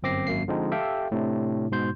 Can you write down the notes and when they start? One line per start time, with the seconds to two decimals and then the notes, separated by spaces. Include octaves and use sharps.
0.03 G1 F#2 C4 D6 A#6 C7
0.27 G#1 F#2 A#3 C7
0.48 D3 F3 G#3 C4 D#4
0.72 G4 A4 E5 F5 G5
1.12 A2 C3 D4
1.72 G#2 B2 C6 G6